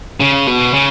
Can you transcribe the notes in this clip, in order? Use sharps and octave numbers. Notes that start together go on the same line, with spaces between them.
C#3
B2
C#3